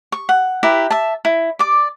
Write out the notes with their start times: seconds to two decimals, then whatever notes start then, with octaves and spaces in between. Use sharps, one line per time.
0.12 C#6
0.29 F#5
0.63 E4 G4 B4 A#5
0.91 E5 A5
1.25 E4
1.59 D5 D6